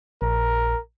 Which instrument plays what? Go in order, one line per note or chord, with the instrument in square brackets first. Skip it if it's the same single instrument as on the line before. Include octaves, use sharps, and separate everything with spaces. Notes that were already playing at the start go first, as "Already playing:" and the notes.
[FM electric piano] A#1 [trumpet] A#4